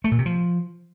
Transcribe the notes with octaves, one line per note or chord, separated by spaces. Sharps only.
A3
A#2
C3
F3